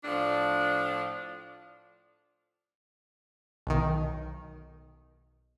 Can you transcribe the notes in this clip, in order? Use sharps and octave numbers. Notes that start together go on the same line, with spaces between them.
A2 F3 D4
B1 D#3